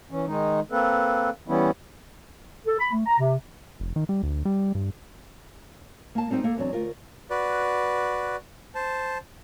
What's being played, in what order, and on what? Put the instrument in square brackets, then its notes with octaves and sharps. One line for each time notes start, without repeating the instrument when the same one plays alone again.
[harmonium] E3 C#4
D#3 G#3 D#4
A#3 C4 A4 B4
E3 G3 B3 C#4 E4
[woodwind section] A4
B5
A3
A#5
C3
[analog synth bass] F1
D#3
G3
D2
G3
G2
[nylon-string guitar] A#3 A5
G3 C4 D#4 C5 G5
A#3 A4
E2 F#3 C4 D4
D2 F4 A#4
[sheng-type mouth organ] F#4 B4 D5
C5 A5